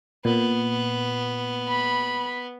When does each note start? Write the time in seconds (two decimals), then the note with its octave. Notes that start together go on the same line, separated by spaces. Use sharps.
0.25 A#2 B3
1.69 B5